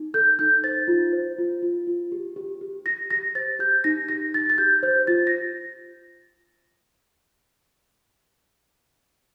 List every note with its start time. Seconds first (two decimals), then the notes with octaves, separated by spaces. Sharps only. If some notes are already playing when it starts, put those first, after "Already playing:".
Already playing: D#4
0.14 A4 G6
0.39 D#4 G6
0.64 C5 A6
0.88 F4
1.13 C5
1.38 F4
1.62 F4
1.87 F4
2.12 G4
2.36 G4
2.61 G4
2.86 G4 A#6
3.11 G4 A#6
3.35 C5 A6
3.59 G4 G6
3.84 D#4 A#6
4.09 G4 A#6
4.34 D#4 A6
4.50 A6
4.58 G4 G6
4.83 C5 G6
5.07 F4 A6
5.27 A#6